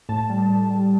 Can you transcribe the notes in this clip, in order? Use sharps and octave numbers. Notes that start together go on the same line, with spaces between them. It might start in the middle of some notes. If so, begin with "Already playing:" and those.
A2 A5
G3
A2
G3